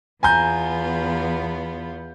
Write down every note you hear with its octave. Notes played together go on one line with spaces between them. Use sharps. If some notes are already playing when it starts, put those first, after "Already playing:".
E2 B3 F4 G#5 A#5 G6